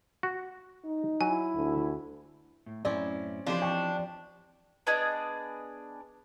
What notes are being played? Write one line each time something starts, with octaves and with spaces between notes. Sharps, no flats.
F#4
D#4
F#3 E4 G#5
D2
A2
F#2 A2 C4 C#4 E4 D5
E3 F3 C4 D4 D#4 G4 C5
G5 C#6
B3 D4 G#4 D#5